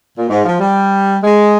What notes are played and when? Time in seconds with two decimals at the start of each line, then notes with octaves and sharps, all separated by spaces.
0.18 A#2
0.30 G#2
0.45 F3
0.61 G3
1.24 G#3